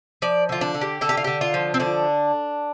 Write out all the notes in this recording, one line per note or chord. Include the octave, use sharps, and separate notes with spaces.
F3 D5
D3 F4
D4
D3
G4
D3 A4
G4
F4
D3 G4
F4
F3
C4
D3 D4